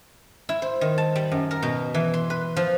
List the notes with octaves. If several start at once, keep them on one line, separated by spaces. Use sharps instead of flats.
E4
C5
D#3
A5
G3
F#2
A#4
B2
E3
C6
B4
F3